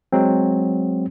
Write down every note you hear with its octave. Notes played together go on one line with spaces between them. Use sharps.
F#3 G#3 C4